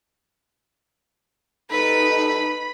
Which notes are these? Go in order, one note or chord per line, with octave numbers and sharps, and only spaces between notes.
G3 D#4 A4 B4 B5